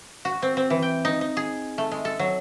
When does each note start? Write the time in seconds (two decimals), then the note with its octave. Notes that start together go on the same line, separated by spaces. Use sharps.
0.25 F#4
0.42 C4
0.57 C4
0.70 E3
0.82 G5
1.05 D#4
1.21 D#4
1.37 G#4
1.78 A3
1.92 G#3
2.05 A4
2.19 F#3